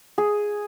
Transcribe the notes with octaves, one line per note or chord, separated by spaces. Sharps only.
G#4